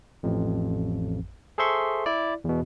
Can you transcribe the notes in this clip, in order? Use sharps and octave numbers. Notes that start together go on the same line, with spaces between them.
A1 F2
G#4 A4 C5 E5 C6 C#6
E4 D5
E2 B2